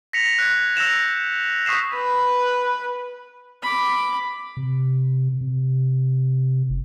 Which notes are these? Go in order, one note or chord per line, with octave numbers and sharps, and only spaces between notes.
A#6 B6 C#7 F7
F#6 G#6
E6 G6 A#6 E7 F7
C#6 D#6 G6 B6 C7 E7
B4
B5 D6
C3
C3
F#1